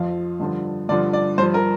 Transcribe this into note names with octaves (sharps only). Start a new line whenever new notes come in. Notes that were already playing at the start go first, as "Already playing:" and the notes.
Already playing: F2 F3 F5
G2 D3 F3
G2 D3 F3 D5
D5
G2 F3 C5
A#4